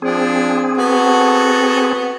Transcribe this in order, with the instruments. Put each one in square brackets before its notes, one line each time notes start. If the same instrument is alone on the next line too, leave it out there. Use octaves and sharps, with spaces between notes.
[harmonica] F3 D4 [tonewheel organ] C4 G#4
[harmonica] B3 F#4 A4